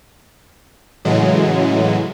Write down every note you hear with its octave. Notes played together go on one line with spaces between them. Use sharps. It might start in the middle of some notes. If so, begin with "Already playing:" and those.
A2 C#3 E3 F#3 G#3